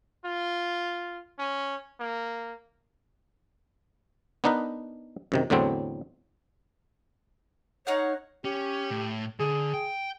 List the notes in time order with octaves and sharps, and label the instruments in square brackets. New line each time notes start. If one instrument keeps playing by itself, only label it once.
[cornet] F4
C#4
A#3
[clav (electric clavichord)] B3 D4 D#4 A#4 B4
F#2 C3 D#3
E2 A2 D3 F#3 C4
[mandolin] D#4 F5 F#5 [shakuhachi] C#5
[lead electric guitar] C#4 [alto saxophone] G4
[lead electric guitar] A2
[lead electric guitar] D3 [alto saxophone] G#4
[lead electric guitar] G5